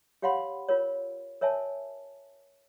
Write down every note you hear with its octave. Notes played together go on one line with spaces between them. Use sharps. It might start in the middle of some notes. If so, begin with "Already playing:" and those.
G4 C#5 F5 F#5 B5 C6
F4 A#4 C#5
A#4 C#5 E5 G#5 A5